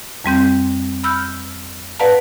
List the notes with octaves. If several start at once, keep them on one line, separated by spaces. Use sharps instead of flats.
F2 G3 C4 G6
B5 E6 F6 G6
B4 D5 F5 F#5 A5 A#5